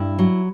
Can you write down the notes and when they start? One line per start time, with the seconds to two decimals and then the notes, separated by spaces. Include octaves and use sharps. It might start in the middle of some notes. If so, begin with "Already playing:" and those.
Already playing: G2 E4
0.19 F#3